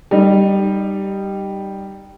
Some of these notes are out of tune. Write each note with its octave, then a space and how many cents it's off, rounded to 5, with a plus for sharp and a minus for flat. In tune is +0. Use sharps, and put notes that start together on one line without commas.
G3 +0 D#4 -20